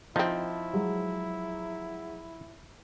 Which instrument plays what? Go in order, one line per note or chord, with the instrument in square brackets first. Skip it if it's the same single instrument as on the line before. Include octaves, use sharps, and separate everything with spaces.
[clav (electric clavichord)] F3 [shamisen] C4 D#4 [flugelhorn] E4
[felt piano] F#3 G#3